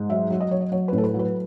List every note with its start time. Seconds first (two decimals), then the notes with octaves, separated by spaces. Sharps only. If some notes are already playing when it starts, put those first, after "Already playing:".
Already playing: G#2
0.10 F#3 E5
0.30 F#3
0.40 D#5
0.51 F#3 C#5
0.61 D#5
0.72 F#3 C#5
0.88 A2 B4
0.98 A4
1.04 B4
1.14 F#3
1.19 B4